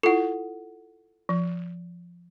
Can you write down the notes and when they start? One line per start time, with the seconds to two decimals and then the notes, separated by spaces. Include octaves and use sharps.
0.03 E4 F4 A4 F#5
1.29 F3